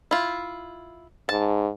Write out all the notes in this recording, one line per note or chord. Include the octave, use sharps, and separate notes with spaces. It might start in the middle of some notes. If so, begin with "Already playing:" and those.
E4 F4
G#2 A5